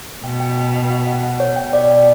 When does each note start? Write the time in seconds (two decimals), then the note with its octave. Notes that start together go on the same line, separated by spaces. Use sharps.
0.24 B2 G5
0.40 G5
0.58 G5
0.74 G5
0.91 F#5
1.07 F#5
1.23 F#5
1.40 C#5
1.56 B2 G5
1.73 D5
1.90 G5